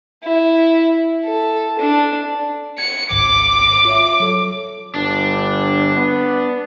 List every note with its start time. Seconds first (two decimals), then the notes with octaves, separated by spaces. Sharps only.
0.24 E4
1.24 A4
1.78 D4
2.78 G#6 C#7
3.11 G#1 C#2 G#2 D6
3.85 F4 C#5 E5
4.20 F#3 A4 C#5
4.95 G1 D4
5.96 B3